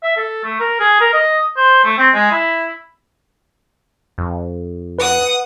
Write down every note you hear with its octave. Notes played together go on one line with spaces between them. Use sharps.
E5
A4
A3
A#4
G#4
A#4
D#5
C5
A3
C4
G#3
E4
F2
B4 F#5 D#6